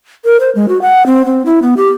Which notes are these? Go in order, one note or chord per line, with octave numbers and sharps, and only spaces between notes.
A#4
C5
G#3
F#4
F#5
C4
C4
E4
B3
G4